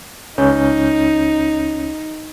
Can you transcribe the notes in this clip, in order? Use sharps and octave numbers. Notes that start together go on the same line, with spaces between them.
C#2 C#4 D#4 G6